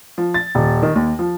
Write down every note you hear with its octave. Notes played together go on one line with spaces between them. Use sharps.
F3
A6
D#1
D#3
D#2
F3